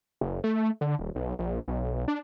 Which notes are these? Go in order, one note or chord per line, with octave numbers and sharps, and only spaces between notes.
F#1
A3
D3
D#1
B1
A#1
B1
D4